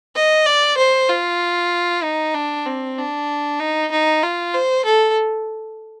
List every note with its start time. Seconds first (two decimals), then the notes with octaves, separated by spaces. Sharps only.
0.15 D#5
0.46 D5
0.77 C5
1.09 F4
2.03 D#4
2.34 D4
2.66 C4
2.97 D4
3.60 D#4
3.92 D#4
4.23 F4
4.54 C5
4.85 A4